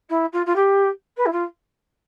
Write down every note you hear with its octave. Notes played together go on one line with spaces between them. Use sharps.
E4
F4
F4
G4
B4
E4
F4